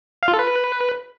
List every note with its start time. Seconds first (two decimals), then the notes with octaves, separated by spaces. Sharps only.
0.23 F5
0.28 F4
0.33 A4
0.39 B4